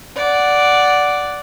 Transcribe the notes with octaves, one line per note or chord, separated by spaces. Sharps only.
D5 F#5